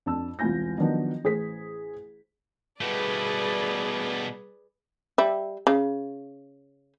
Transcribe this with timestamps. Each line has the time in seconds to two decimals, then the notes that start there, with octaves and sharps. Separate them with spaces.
0.06 F2 D4 A5 E6
0.39 E1 C2 F4 G#5 G6 A#6
0.78 D#3 F3 F#3 B3 D4 D#4
1.24 A1 G#4 C5 B6
2.81 B2 G3 A3 G#4 B4 D5
5.18 G3 E5
5.67 C#3